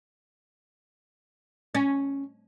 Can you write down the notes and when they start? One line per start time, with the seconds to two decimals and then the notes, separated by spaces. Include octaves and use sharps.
1.75 C#4